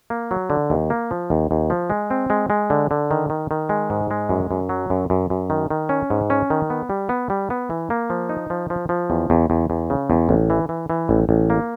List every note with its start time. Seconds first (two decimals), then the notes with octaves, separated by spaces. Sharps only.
0.10 A#3
0.31 F#3
0.50 D3
0.70 D#2
0.90 A#3
1.11 F3
1.30 D#2
1.51 D#2
1.70 F3
1.90 G#3
2.11 C4
2.30 G#3
2.50 G#3
2.70 D3
2.91 D3
3.11 D#3
3.30 D#3
3.51 D#3
3.69 G#3
3.90 G#2
4.11 G#3
4.29 F#2
4.51 F#2
4.69 F#3
4.90 F#2
5.10 F#2
5.30 F#2
5.50 D#3
5.70 D#3
5.89 C#4
6.10 G#2
6.30 C#4
6.50 D#3
6.70 B3
6.90 G3
7.09 B3
7.30 G3
7.50 B3
7.70 E3
7.90 A#3
8.10 F3
8.29 D#4
8.50 F3
8.70 F3
8.89 F3
9.10 E2
9.30 E2
9.50 E2
9.70 E2
9.90 C#3
10.10 E2
10.29 A1
10.50 E3
10.69 E3
10.90 E3
11.09 A1
11.29 A1
11.50 A#3